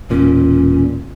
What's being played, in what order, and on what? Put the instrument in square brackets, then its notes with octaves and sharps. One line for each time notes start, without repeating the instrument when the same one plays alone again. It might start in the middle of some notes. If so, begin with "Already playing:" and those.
[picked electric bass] E1 A#2 [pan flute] C#4